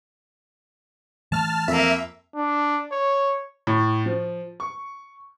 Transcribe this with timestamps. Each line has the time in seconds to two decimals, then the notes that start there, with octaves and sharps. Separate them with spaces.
1.32 E3 A3 A5 F6
1.68 F2 A#3 E5
2.36 D4
2.92 C#5
3.67 A2
4.06 F3
4.60 C#6